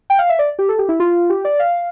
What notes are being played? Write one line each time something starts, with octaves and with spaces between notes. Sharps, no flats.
G5
F5
E5
D5
G4
A4
G4
E4
F4
G4
D5
F5